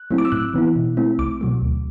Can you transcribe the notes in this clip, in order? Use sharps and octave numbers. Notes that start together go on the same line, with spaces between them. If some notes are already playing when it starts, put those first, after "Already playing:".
Already playing: F#6
F#3 A3 C4 E4
D6
E6
A2 F#6
E3 B3 E4
B2
A3 C4 E4
C2 D6
B2 F#3 A3
D2